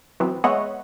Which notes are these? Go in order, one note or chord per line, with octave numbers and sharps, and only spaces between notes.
E3 F#3 B3 C4
G#3 B3 C#5 D#5 E5 F#5